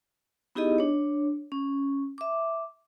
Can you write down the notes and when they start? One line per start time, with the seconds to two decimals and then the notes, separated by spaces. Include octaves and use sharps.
0.55 B3 D#4 E4 G4 G#4 D#5
0.78 D4 C#5
1.52 C#4
2.18 E5 D6